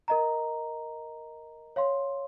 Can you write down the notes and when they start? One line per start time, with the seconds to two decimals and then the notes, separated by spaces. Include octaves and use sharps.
0.08 A#4 D#5 A#5
1.76 C#5 F5 C6